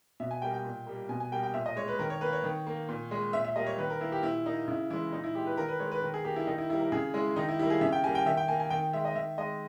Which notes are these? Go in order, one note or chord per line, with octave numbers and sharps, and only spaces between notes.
B2 E5
G#5
G3 A#3 G5
G5
A#2
G3 A#3
B2 G#5
G#5
G3 A#3 G5
G5
A#2 E5
D#5
G#3 C#5
B4
D#3 A#4
C#5
A#3 B4
C#5
D#3
A#3
A#2
G#3
A#2 E5
E5
G3 A#3 D#5
C#5
D#3 B4
A#4
A#3 E4
G4
A#2 E4
A#3 D#4
C#3 E4
E3 G#3 E4
A#2 D#4
E4
G#3 G4
B4
D#3 A#4
B4
G#3 C#5
B4
D#3 A#4
G#4
A#3 G4
E4
D#3 D#4
E4
G3 A#3 E4
A#4
C#3 G#4
G#3 E4
D#3 D#4
E4
G3 A#3 E4
G#4
C#3 E5
G5
G3 A#3 G#5
G5
D#3 E5
G5
A#3 G#5
G#5
D#3 G5
G#3 E5
D#5
D#3 E5
G#3 D#5